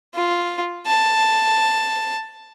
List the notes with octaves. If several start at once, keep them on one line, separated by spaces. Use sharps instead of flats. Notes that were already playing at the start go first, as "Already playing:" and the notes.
F4
A5